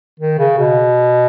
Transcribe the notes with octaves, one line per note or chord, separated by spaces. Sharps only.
D#3
C#3
B2